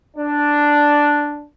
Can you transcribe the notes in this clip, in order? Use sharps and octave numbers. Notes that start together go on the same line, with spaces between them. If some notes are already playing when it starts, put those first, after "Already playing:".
D4